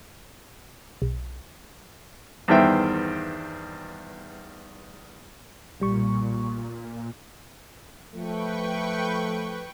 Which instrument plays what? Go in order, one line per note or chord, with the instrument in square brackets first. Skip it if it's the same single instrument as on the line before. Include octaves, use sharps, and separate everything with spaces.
[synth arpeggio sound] B1
[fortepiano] E2 G2 D#3 C5 E5 G5
[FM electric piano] B1 G3 C#6 [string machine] A#2
[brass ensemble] F3 A3 [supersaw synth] B4 G5 C#6